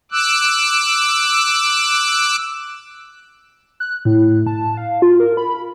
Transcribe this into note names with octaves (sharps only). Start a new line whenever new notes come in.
D6 E6 F#6
F#6
A2
A5
F5
F4
A#4
B5